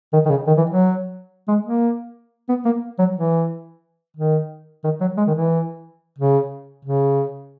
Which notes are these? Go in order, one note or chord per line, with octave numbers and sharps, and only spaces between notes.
D#3
D#3
C#3
D#3
E3
F#3
G#3
A#3
B3
A#3
F#3
E3
D#3
D#3
F#3
G#3
D#3
E3
C#3
C#3